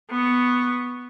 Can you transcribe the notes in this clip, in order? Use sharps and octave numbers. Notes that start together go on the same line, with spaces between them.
B3 C#6